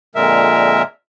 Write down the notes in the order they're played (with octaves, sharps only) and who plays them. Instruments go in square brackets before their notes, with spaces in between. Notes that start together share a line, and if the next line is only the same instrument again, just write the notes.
[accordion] F2 A#2 D3 G#3 A#4 E5